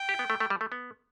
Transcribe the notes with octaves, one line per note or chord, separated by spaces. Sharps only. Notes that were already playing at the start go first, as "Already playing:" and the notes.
Already playing: G5
G4
B3
A3
A3
G3
A3
B3